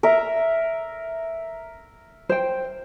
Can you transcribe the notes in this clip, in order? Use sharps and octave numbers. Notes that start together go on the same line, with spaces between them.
A#4 E5
C5 G5